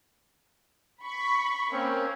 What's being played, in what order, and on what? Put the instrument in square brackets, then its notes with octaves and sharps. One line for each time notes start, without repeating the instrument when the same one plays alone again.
[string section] B5 C#6
[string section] A#3 [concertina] C4 C#4